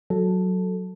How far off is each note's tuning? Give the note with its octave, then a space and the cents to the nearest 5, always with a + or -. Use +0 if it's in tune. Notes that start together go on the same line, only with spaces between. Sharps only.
F#3 +0 A4 +0